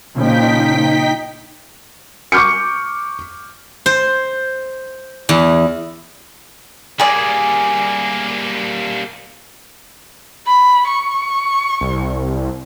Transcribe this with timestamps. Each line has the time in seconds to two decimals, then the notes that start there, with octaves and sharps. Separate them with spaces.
0.16 A#2 C#3 F3 D#4 G5 B6
2.32 C#6 D6 F6 G6 C#7
3.86 C5
5.29 E2
7.00 G3 A#3 G#4 D5
10.47 B5
10.88 C#6
11.81 C2